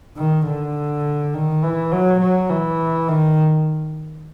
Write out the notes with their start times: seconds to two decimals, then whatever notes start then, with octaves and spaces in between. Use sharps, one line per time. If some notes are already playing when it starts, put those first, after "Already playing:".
0.17 D#3
0.46 D3
1.34 D#3
1.63 E3
1.92 F#3
2.21 F#3
2.50 E3
3.08 D#3